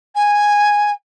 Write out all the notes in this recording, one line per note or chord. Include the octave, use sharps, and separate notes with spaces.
G#5